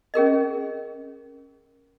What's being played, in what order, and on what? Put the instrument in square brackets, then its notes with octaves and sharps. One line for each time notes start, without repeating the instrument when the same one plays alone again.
[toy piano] C#4 G#4 A#4 D#5